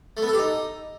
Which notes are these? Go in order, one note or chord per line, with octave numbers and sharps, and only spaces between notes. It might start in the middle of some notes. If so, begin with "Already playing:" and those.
A3
B3
A4
G4
D#4